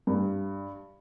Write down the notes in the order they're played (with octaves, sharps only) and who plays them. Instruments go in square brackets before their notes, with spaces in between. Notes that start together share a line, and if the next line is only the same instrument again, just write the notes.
[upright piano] G2 G3